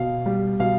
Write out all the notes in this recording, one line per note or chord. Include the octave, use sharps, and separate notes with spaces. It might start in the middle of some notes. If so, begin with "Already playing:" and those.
Already playing: B2 F5
G3
B2 F5